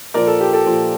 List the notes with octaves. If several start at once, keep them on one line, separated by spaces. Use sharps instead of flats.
A#2 F3 A#4 D5
A4
G4
A4
A#2 F3